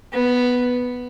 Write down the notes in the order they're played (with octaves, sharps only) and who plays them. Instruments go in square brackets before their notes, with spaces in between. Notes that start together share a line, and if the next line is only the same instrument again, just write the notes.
[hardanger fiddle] B3